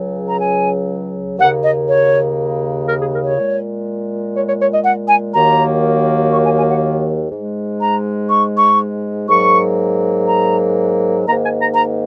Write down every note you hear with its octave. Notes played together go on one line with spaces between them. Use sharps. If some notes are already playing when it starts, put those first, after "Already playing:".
Already playing: C#2 C#3 F#3
A#5
G#5
D#2 C#3 A#3 F#5
D#5
C#5
A#4
G#4
A#4
C#5
A#2 G#3
C#5
C#5
C#5
D#5
F#5
G#5
D#2 D#3 F#3 A#3 A#5
C#6
G#5
G#5
F#5
G#2 G#3
A#5
C#6
C#6
G#2 F#3 A#3 C#6
A#5
G#2 D#3 A#3 A#5
G#5
A#5
A#5